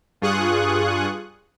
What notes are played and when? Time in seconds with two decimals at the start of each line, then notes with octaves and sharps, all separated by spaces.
0.21 G2 F4 G#4 C#6 D#6 F#6